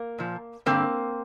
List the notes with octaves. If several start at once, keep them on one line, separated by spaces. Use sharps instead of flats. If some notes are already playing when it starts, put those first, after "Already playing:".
Already playing: A#3
A#2 F3
G2 D3 F3 A#3 C4